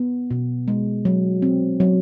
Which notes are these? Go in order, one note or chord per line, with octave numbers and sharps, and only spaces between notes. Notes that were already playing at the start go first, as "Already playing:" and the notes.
Already playing: B3
B2
G#3
F#3
C4
F#3